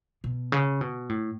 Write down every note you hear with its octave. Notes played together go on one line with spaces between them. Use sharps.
B2
C#3
B2
A2